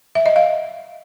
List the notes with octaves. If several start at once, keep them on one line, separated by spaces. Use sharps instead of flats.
E5
D#5
F5